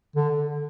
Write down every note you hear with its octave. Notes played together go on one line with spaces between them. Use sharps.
D3